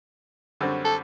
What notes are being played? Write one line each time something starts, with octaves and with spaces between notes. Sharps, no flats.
F#2 D3 G3 C4 F#4
A4